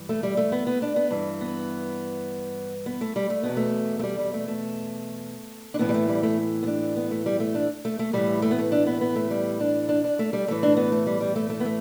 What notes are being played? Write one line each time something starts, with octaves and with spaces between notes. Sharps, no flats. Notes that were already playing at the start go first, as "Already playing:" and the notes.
Already playing: G2 E3
A3
G3
A3
B3
B3
D4
B3
G2 E3
B3
B3
A3
G3
A3
E2 B2 B3
A3
A3
G3
G3
A3
A3
D4
A2 E3 B3
G3
A3
G3
A3
B3
D4
B3
A3
G3
A3
D4
A3
A3
A2 E3 G3
A3
B3
A3
D4
B3
B3
A3
G3
D4
D4
D4
A3
G3
A2 E3 A3
D4
B3
A3
G3
G3
A3
A3
B3
A3